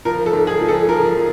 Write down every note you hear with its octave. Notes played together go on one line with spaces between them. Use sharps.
F3 A#4
A4
G#2
G#4
F3
A4
F3 A#4
F3